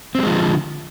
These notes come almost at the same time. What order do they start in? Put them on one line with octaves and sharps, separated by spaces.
C4 G3 G#3 F3 D3